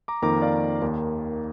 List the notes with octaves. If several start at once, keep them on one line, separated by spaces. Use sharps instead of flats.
A#5 D6
F2 D#3 A#3 A#5 D6
D5 F5
D#2 D#3 A#3